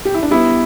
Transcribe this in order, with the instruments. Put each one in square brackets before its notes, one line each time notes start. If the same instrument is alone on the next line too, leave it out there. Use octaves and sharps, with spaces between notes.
[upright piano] G4
E4
D4
[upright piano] G3 B3 [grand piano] E4